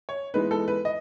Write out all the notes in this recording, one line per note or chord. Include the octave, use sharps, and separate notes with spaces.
C#5
E3 G#3 B3 D#4 B4
A4
B4
D#5